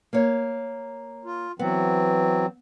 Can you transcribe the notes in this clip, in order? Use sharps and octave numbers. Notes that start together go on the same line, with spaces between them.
A#3 C#5
F4
E3 F#3 B3 C4